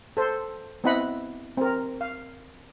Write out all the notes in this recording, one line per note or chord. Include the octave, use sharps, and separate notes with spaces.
A4 C5
B3 C4 E4 D#5 F#5 B5
C4 A#4
F5